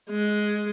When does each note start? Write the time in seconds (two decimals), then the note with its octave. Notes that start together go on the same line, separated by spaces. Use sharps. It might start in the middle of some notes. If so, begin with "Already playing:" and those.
0.10 G#3